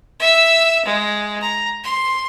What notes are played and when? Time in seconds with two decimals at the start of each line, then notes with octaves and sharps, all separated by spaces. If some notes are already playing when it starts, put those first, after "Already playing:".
0.20 E5 E6
0.85 G#3
1.41 A#5
1.84 C6